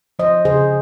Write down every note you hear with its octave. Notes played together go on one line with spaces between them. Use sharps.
F3 C5 D#5
C#3 G#4 C5